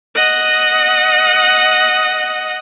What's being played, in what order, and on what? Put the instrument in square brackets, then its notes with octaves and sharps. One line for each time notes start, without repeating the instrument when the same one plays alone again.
[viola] D#5 F#5